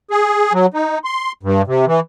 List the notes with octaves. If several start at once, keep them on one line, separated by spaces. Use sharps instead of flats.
G#4
F#3
D#4
C6
G2
C3
E3